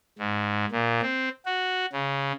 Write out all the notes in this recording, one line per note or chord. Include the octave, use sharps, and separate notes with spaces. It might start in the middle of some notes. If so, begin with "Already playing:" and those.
G#2
A#2
C4
F#4
C#3